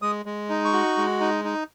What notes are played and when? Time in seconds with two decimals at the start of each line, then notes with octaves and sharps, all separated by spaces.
0.02 G#3 D#6
0.26 G#3
0.49 D#4
0.65 C#6
0.73 F#4
0.97 G#3
1.20 D#4
1.45 D#4